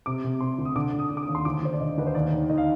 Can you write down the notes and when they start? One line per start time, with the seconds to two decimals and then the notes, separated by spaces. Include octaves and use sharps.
0.06 C3 D6
0.24 C3
0.41 C3 C6
0.58 D2
0.65 D#6
0.75 D3 D6
0.93 D3
0.99 D#6
1.11 D3
1.17 D6
1.23 D#2 D#6
1.35 C6
1.45 D2 D6
1.63 D2 C5
1.73 D5
1.80 D3 D#5
1.98 D2 B4
2.07 C5
2.15 D#2 D5
2.32 D#3
2.49 D#3 D#5
2.58 F5